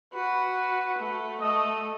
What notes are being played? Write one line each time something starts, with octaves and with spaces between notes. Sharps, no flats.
F#4 B4
A3
A3 D#5